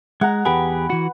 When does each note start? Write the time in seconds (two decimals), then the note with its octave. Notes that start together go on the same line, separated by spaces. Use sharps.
0.21 G#3 F#5 A#5
0.45 E2 G4 G#4 B4
0.90 E3 F#4